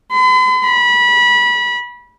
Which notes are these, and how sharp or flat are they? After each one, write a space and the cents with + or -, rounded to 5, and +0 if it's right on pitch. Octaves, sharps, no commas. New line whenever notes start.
B5 +45
B5 -25